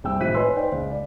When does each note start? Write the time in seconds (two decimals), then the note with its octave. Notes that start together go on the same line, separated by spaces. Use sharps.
0.04 C2 C4 G5 E6
0.20 G#1 A2 F3 F#6 B6 D#7
0.34 B4 C#5 D#5 G#5 C6 E6
0.56 D#4 B4 C5 D5 G5
0.72 C#2
0.92 D5